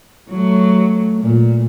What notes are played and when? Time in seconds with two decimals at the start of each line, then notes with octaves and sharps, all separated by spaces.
0.30 F#3 A3
1.19 A#2